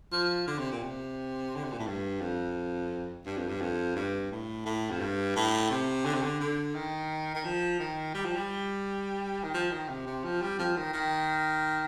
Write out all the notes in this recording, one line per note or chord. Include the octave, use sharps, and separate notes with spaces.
F3
D3
C3
A#2
C3
D3
C3
A#2
A2
G2
F2
G2
F2
G2
F2
G2
A2
A2
F2
G2
A2
C3
D3
C3
D3
D3
D#3
D#3
F3
D#3
G3
F3
G3
D#3
F3
D#3
C3
C3
F3
G3
F3
D#3
D#3